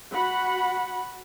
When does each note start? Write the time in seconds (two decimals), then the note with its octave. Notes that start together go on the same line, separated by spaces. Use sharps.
0.12 F#4 F#5 B5